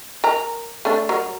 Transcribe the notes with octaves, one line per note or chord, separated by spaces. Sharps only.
A#4 A#5
A3 D4
F#3 A#4